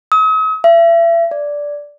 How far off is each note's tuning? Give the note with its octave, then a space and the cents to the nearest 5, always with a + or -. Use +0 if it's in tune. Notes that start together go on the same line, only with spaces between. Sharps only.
D#6 +45
E5 +35
D5 -5